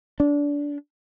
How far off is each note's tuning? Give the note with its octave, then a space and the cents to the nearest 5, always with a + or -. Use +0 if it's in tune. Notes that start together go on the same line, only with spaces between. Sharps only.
D4 -20